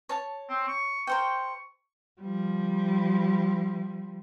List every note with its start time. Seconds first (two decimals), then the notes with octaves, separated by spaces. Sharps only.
0.09 C#5 A5
0.49 C4
0.68 C#6
1.07 A#4 C5 G5 C#6
2.20 F3 G3